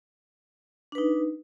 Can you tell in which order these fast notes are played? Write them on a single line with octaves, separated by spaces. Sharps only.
D4 B4 D#4